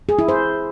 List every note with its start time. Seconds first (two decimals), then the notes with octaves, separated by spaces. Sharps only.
0.09 G#4
0.19 E4
0.29 C5